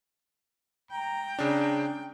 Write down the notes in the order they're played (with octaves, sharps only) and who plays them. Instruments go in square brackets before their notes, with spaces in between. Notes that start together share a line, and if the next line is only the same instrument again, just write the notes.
[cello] G5 [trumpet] A#5
[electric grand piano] C#3 D4